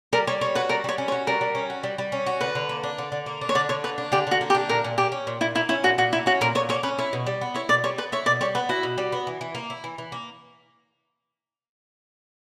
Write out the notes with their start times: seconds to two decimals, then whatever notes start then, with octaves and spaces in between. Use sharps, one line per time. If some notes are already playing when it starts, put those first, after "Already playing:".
0.13 G3 A#4
0.27 G3 C#5
0.41 C#4 C#5
0.55 F#4 B4
0.69 G3 A#4
0.84 G3 C#5
0.98 C#4
1.08 C#5
1.12 F#4
1.27 G3 A#4
1.41 G3
1.55 C#4
1.70 F#4
1.83 G3
1.98 G3
2.12 C#4
2.26 F#4
2.41 D3 B4
2.55 D3
2.69 A#3
2.84 D4
2.98 D3
3.12 D3
3.26 A#3
3.41 D4
3.49 C#5
3.55 D3 D5
3.69 D3 C#5
3.84 A#3 B4
3.98 D4
4.12 D3 G4
4.27 D3 F#4
4.41 A#3
4.50 G4
4.55 D4
4.69 A#2 A#4
4.84 A#2
4.98 A#3 G4
5.12 C#4
5.27 A#2
5.41 A#2 E4
5.55 A#3 E4
5.69 C#4 E4
5.84 A#2 F#4
5.98 A#2 F#4
6.12 A#3 E4
6.26 C#4 F#4
6.41 A#2 A#4
6.55 A#2 C#5
6.69 A#3 C#5
6.83 C#4 B4
6.98 E4 C#5
7.13 B2
7.27 G3
7.41 B3
7.55 E4 C#5
7.69 B2 D5
7.84 G3 C#5
7.98 B3 B4
8.12 E4 C#5
8.26 B2 D5
8.41 G3 C#5
8.55 B3 B4
8.69 E4 F#4
8.83 B2
8.98 G3
9.12 B3
9.27 E3
9.41 E3
9.55 A#3
9.70 E4
9.84 E3
9.98 E3
10.12 A#3